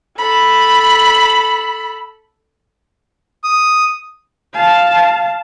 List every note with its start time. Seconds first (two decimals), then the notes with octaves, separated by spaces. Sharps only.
0.18 A4 B5
3.44 D#6
4.54 F5 A5